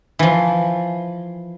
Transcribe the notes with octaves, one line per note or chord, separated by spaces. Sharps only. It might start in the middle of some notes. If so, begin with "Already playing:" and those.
E3 F3